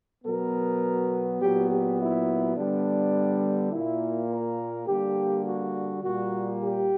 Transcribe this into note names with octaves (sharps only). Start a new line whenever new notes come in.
B2 F#3 B3 A#4
A#2 F#3 B3 G4
G4
E4
D3 G3 B3 D4
A#2 A#3 E4
A#4
D3 G3 A#3 G4
F#4
A#2 G3 A#3 F#4
G4